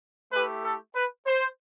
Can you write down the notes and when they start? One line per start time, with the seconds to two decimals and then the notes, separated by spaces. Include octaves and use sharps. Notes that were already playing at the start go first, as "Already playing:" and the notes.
0.32 A3 E4 G4 B4
0.64 A4
0.95 B4
1.26 C5